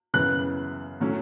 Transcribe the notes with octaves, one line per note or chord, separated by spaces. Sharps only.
F#2 C#3 E3 B3 F#6
A2 F#3 A3 C#4